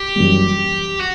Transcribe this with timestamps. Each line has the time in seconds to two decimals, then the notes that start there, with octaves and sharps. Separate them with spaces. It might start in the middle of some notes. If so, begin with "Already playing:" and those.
Already playing: G4
0.16 F#2 E3 G3
1.00 F#4